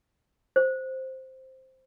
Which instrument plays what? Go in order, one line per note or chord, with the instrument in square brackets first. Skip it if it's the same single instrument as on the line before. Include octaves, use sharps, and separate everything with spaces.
[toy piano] C5